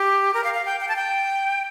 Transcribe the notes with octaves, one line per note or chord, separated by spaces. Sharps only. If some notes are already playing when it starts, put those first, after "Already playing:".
Already playing: G4
A#4
F5
F5
G5
G5
A5
G5